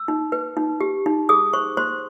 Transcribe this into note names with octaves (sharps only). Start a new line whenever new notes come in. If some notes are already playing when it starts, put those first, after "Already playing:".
Already playing: E6
D#4
B4
D#4
G4
D#4
G#4 D#6
C5 C#6
C5 C6